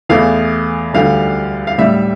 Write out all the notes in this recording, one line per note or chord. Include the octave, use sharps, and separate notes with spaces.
E2 E3 A3 F5
D2 D3 G3 F5
F5
A2 G3 E5